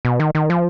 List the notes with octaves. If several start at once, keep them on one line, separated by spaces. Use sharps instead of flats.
B2
D#3
D#3
F3